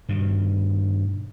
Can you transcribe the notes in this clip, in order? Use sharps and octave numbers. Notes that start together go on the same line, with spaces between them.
G2 B2 D#3